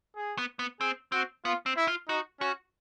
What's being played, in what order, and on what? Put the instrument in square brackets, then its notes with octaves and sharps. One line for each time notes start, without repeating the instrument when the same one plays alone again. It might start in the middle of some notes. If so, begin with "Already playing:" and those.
[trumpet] G#4
[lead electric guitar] B3
B3
[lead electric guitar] C4 [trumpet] G#4
[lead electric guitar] C4 [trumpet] F#4
[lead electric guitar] B3 [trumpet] F4
[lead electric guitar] C4
[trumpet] E4
[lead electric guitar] F4
[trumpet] D#4 [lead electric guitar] F#4
[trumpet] C#4 [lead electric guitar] F#4